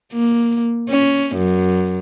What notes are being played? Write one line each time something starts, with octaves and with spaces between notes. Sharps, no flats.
A#3
C#4
F#2